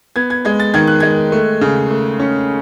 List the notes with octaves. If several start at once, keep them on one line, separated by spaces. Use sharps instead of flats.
B3 G#6
G#6
G#3 G#6
A6
D#3 G#6
F#6
G#3 G#6
A3
C#3
A3
C#4